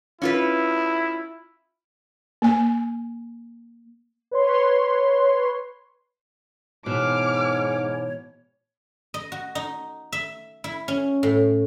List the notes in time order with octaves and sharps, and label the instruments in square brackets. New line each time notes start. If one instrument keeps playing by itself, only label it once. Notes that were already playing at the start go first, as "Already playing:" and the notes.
[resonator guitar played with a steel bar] C#4 F4 B4 [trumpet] E4
[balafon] A#3 G#5
[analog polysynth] B4 C#5 C6
[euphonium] G#2 [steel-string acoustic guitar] B2 E3 [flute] C#5 [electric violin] D6 F6
[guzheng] D#5
F#4
D#4
E5
E4
C#4
A2